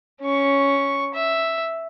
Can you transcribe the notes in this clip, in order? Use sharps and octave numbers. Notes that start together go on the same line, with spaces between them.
C#4 C#6
E5